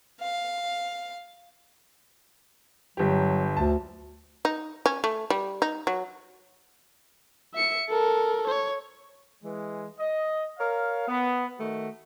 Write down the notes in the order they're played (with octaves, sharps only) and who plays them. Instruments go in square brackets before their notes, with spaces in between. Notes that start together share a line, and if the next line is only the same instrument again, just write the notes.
[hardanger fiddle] F5
[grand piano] G1 G4 [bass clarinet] F#3
[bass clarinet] D2 [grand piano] A5
[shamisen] D#4
C#4
A3
G3
D#4
F#3
[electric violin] E5 C#7
A4 A#4
C#5
[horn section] E3 G#3
D#5
A#4 C#5 F5
B3
D#3 A3 F#4